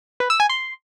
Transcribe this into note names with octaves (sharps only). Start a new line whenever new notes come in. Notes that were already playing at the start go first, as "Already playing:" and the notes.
B4
E6
G#5
C6